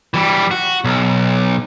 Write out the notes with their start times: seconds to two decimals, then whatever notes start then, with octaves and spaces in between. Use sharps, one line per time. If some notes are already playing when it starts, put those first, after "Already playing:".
0.14 E3 G3
0.51 F#4
0.84 B1